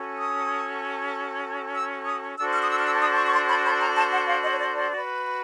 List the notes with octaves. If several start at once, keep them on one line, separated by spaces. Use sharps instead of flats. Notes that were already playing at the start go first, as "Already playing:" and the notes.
Already playing: C#4 F#4 A4
D#6
E6
D#6
D4 F#4 A4 C5 E6
F6
D#6
E6
F6
E6
D#6
C#6
C#6
C6
B5
B5
A#5
A5
F#5
F5
D#5
C#5
D5
D5
F#4 B4